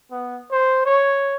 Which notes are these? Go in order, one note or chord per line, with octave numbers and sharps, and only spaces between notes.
B3
C5
C#5